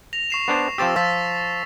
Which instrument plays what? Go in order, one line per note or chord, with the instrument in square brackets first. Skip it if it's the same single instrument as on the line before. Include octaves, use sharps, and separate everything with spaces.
[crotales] A#6 F7
C#6 C7 E7
[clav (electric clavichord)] B3 D4 C5
[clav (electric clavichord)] F3 C4 G4 [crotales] E6 A6 E7
[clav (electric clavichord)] F3 [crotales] E6 A6 B6